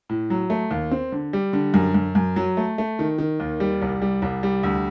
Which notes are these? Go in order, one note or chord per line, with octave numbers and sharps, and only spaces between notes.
A2
F#3
A3
D#2
C4
D3
G3
D3
F#2
F#2
F#2
F#3
A3
A3
D#3
D#3
D#2
G3
C2
G3
C2
G3
D2